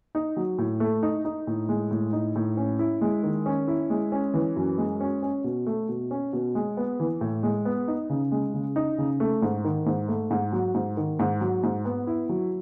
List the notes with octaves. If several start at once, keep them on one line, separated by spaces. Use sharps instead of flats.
D#4
F#3
A2
A3
D#4
D#4
A2
G#3
A2
D#4
A2
C#4
E4
G#3
D#3
C#4
E4
G#3
C#4
E3
F#2
G#3
C#4
C#4
B2
A3
B2
C#4
B2
G#3
B3
E3
A2
G#3
B3
D#4
C#3
G#3
C#3
D#4
C#3
A3
G#2
D#3
G#2
A3
G#2
F#3
G#2
D#3
G#2
F#3
G#2
B3
E4
F#3